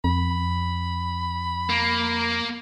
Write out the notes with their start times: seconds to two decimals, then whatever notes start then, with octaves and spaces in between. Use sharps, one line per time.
0.04 F2 B5
1.69 A#3